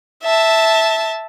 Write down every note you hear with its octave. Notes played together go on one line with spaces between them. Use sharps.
E5 A5